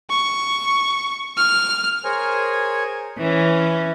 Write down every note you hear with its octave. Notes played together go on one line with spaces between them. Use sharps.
C#6
F6
G#4 A#4 C5 C#5 G#5
E3 C#4